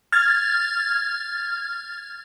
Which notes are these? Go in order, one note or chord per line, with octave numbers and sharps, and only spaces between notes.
F6 G#6 A6